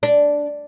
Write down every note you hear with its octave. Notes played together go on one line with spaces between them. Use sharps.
D4